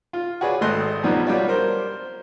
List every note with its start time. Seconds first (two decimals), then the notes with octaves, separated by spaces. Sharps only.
0.13 F4
0.41 F#4 G#4 B4 C#5 D5
0.61 G#1 G#3 A3 D#5 C6 F#6
1.04 F2 B2 F#3 G3 D#4
1.27 G3 D4 F4 F#4 C#5 D5
1.48 A#4 C5